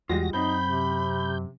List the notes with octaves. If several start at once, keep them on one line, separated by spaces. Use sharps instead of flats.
E2 G3 G#3 F4 F#4 A#6
F#2 C4 D#4 A#5 B5 G6
C3